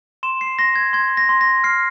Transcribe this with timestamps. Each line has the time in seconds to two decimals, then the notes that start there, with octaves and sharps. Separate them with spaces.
0.23 C6 E7
0.41 C7
0.59 C6 A#6
0.76 G#6
0.93 C6 G#6
1.17 A#6
1.29 C6
1.41 A#6
1.64 F6 C7